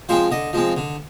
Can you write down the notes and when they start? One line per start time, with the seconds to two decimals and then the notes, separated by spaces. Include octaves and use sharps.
0.09 F3 G#3 C4 C5
0.31 D3 D#5
0.53 F3 G#3 C4
0.77 D3